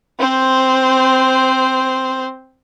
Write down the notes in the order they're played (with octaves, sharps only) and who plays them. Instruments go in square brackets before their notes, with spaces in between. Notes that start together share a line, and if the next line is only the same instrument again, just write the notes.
[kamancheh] C4 C5